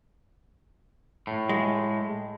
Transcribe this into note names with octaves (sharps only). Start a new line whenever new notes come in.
A2
G#3